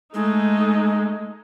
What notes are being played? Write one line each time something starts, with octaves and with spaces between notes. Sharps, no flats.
G#3 A3 D#4